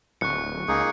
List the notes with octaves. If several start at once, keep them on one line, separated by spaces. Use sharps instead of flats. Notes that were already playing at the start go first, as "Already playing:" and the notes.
D1 C#6 F#6 C#7
C#2 A#3 D#4 G#4